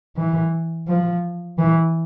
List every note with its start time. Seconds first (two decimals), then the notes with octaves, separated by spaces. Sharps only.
0.17 E3
0.88 F3
1.58 E3